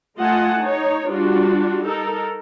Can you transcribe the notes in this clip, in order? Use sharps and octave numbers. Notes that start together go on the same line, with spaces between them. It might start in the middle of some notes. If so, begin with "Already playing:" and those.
A3 F4 D#5 F#5 G#5 A5
D#4 C#5
G3 D4 F4 F#4
D#4 A4 A#4